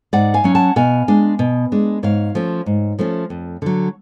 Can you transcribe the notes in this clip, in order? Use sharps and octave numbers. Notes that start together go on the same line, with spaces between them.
G#2 D5 F#5
F5 G#5
F#3 C#4
F#5 A5
B2 F5 G#5
G#3 D4
B2
G#3 D4
G#2 C#5 F5
F3 A3 C#4
G#2
F3 A3 C#4
F2
D3 F#3